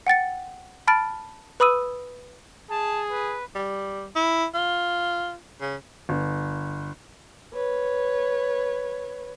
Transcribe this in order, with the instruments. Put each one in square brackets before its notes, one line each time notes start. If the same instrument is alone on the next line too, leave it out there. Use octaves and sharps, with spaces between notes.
[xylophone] F#5 G5 A6 C#7
A5 B5 F6 A6 D7
B4 B5 D#6 E6 D#7
[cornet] G#4 [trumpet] A5
[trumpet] B4
[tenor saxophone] G3
E4
F4
C#3
[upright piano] G1
[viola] B4 C#5